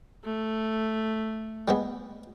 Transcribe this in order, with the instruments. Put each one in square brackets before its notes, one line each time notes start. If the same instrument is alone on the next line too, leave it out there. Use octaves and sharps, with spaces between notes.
[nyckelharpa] A3
[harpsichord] G3 G#3 B3